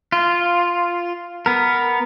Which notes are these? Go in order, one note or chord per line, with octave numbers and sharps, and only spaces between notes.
F4
B3 A#4